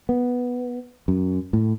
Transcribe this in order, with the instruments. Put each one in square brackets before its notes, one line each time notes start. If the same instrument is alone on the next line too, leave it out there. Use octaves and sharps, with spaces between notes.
[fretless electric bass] B3
F#2
A2